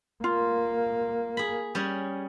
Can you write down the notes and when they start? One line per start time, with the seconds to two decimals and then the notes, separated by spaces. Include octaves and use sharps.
0.24 A#3 F4
1.37 G#4 B5
1.75 G3 C#4 G#4